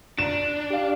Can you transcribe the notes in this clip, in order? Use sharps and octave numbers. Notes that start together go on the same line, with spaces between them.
D4 E7
G4 F5